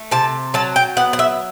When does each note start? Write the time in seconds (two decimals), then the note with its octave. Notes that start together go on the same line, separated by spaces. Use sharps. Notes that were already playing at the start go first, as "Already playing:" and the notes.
Already playing: A3
0.11 C3 A5
0.54 F#3 A5
0.76 G5
0.97 B3 F#5
1.13 F#5
1.19 E5